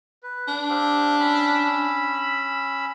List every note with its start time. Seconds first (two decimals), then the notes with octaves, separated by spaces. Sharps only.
0.23 B4
0.48 D4
0.69 C4 G4 F5
1.20 C#4 B5 E6